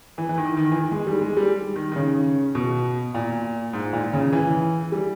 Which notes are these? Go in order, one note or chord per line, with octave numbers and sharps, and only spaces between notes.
E3
E3
D#3
D#3
E3
D#3
G#3
G3
G#3
G3
D#3
D#3
C#3
B2
A#2
G#2
A#2
C#3
E3
G3